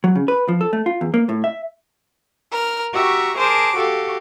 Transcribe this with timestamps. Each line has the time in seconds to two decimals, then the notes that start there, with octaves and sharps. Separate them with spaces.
0.04 F#3
0.15 C#3
0.28 B4
0.48 F3
0.61 A4
0.73 A3
0.86 F4
1.01 E2
1.14 A#3
1.29 A2
1.44 E5
2.50 A#4 F6
2.94 F#4 G4 E5 A#5 C#6
3.37 G#4 A#4 C5 A5 D6
3.77 F#4 G4 A4 F5